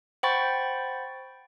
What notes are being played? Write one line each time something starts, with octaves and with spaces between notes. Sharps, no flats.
C5 F#5 G5 B5 C#6 A6